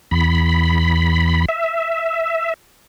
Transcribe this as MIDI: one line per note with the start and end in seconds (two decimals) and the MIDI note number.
0.11 1.45 40
0.11 1.45 83
1.49 2.54 76